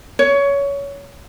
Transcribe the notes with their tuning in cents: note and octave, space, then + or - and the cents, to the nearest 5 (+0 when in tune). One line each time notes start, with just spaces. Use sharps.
C#5 +20